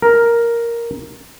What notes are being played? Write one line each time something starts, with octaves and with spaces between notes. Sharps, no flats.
A#4